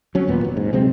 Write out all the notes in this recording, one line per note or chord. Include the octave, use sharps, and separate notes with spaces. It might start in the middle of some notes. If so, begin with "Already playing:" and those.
F#3 C#4
D#2 A#2 B3
F1
G#2
C3 F#3 G#3 C4